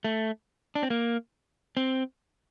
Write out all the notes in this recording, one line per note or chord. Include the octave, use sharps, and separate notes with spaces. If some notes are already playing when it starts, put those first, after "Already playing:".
A3
D4
C4
A#3
C4